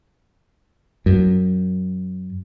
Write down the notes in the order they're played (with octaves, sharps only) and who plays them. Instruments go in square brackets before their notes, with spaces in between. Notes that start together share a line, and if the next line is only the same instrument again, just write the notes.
[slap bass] F#2